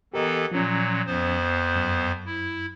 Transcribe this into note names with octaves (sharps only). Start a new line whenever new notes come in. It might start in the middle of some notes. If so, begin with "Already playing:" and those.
E3 B3 G4 A4 A#4 D#5
A#2 F3 F#3 C#4
F2 B3 C5
F#2
E4